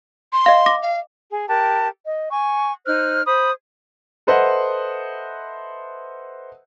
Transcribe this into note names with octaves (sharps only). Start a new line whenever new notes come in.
C6
D#5 F5
D6 A#6
F5
G#4
G4 A#4 A5 F#6
D#5
G#5 C#6
D#4 C5 F6 F#6
C5 B5 D#6
A4 B4 C5 D#5 E5 F#5